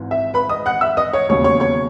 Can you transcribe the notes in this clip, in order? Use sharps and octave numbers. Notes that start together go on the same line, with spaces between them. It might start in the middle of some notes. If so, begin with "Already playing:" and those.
Already playing: G#1 G#2 E3
E5
B4 B5
D#5 D#6
F#5 F#6
E5 E6
D#5 D#6
C#5 C#6
E1 D#2 C#3 F#3 C#5 C#6
C#5 C#6
C#5 C#6